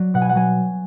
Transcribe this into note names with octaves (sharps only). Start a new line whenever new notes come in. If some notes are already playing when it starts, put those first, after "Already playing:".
Already playing: F#3 D5
B2 F#5
G#5
F#5
F#3 G#5